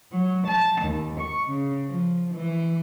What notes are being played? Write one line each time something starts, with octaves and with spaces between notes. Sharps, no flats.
F#3
A5
D#2
C#6
C#3
F3
E3